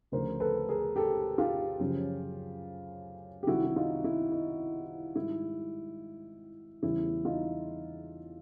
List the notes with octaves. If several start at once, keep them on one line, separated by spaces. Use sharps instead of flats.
D2 C#3 F3 A#4 C5
A4 B4
G#4 A#4
G4 A4
F4 G4
F#2 C#3 F3
G4
C2 C3 D#3 G3 E4 F#4
E4
D#4 F4
E4
D#4
G#2 D#3 G3 E4
E2 C#3 E3 G3 E4
D#4 F4